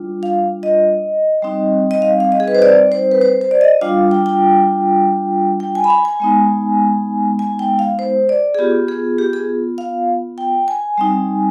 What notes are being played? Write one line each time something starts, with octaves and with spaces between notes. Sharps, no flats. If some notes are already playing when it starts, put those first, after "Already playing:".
Already playing: G3 D4 F4
F5
D#5
G3 C4 D#4
D#5
F5
F5
D#5
G#4
B4
C5
D5
C5
B4
C5
C5
D5
D#5
G3 D4 F4 F5
G5
G5
G5
G#5
B5
G#5
G#5
G#3 B3 D#4
G#5
G5
F5
C5
D5
G#4
B3 F4 G4
G#4
G4
G#4
F5
G5
G#5
G3 C4 D#4